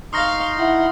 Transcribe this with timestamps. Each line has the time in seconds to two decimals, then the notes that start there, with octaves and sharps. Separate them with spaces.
0.13 D#4 F5 C6 C#6 D#6 F6 A#6
0.59 E4 F#5